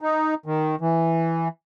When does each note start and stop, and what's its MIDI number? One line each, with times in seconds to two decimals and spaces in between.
0.01 0.34 63
0.46 0.76 51
0.81 1.48 52